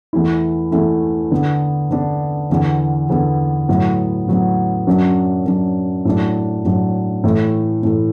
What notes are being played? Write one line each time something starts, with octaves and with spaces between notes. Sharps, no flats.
E2 E3 A3 E4
E2 E3 A3 E4
D3 B3 D4
D3 B3 D4
E2 D3 B3
E2 D3 B3
A2 F#3 B3
A2 F#3 B3
F#2 F#3 D4
F#2 F#3 D4
A2 F#3 D4
A2 F#3 D4
A2 E3 A3
A2 E3 A3